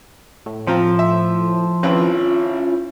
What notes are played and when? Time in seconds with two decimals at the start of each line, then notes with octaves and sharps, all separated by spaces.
0.46 A2
0.67 F3 C4 F4 A#5
0.99 E5
1.83 G#1 C4 C#4 E4 F4 B4